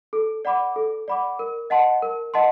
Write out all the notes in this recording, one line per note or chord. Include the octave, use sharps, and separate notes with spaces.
A4
D5 F#5 B5 D6
A4
D5 F#5 B5 D6
A#4
D#5 F#5 A5 C6
A#4
D#5 F#5 A5 C6